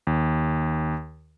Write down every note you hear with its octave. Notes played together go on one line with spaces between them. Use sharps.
D#2